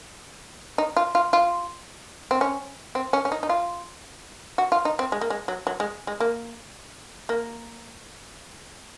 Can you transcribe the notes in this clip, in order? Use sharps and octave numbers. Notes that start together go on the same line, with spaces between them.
D#4
F4
F4
F4
C4
C#4
C4
C#4
C#4
D#4
D#4
F4
F#4
F4
D#4
C4
G#3
A#3
G#3
F#3
F#3
G#3
G#3
A#3
A#3